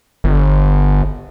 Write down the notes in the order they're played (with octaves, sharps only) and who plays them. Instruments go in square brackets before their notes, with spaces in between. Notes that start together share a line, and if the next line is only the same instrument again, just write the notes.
[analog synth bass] G1